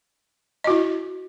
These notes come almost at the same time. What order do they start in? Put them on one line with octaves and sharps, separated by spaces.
D#5 F#4 E4